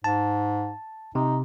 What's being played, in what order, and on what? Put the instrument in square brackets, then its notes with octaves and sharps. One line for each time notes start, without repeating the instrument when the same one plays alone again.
[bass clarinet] G#2 [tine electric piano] A5
[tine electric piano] C3 [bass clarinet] D#4